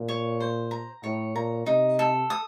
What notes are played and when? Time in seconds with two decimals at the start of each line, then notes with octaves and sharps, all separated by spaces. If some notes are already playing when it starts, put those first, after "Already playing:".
Already playing: A#2
0.09 C#5
0.40 C5
0.71 A#5
1.03 A2 C#5
1.35 A#2 A#5
1.66 C3 D#4
1.99 A4
2.30 D#6